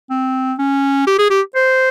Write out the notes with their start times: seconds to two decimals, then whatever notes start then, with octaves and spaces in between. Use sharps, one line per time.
0.10 C4
0.59 C#4
1.07 G4
1.19 G#4
1.30 G4
1.56 C5